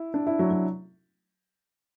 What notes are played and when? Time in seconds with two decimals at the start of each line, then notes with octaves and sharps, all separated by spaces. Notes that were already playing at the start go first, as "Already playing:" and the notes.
Already playing: E4
0.14 D4
0.27 E4
0.39 F#3
0.51 F#3